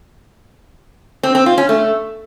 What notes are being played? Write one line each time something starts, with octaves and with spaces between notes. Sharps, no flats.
C4
C4
F4
C#4
A3